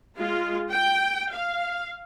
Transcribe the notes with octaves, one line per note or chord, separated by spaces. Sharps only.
G#3 F4
G5
F5